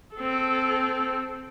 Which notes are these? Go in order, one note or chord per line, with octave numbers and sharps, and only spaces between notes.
C4 A4